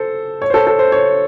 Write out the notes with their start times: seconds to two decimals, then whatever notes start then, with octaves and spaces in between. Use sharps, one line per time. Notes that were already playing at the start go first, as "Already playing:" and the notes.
Already playing: A4 C5
0.42 C#5
0.50 C5
0.54 A4
0.67 A4
0.79 C5
0.92 C#5